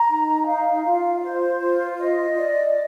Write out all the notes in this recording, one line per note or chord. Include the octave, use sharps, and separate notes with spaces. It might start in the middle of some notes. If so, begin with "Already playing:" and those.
Already playing: A#5
D#4
F5
F4
C5
F4
D#5
D5